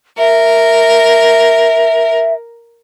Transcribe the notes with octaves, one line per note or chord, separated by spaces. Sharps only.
A#4 E5